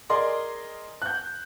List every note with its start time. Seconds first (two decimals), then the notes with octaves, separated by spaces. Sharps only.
0.10 G#4 A#4 D5 D#5 C6
1.02 F#6 G6